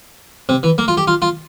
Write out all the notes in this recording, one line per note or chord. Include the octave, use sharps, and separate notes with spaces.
C3
E3
A#3
F4
G4
F4
F4